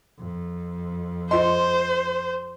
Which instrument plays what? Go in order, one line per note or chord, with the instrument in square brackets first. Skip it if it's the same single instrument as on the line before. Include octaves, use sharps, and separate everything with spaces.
[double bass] F2
[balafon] F4 D#5 [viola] C5 [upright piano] C6